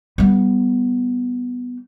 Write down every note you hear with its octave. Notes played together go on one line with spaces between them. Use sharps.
G3 B3